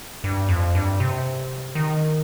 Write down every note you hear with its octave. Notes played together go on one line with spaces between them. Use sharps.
G2
F2
G2
C3
D#3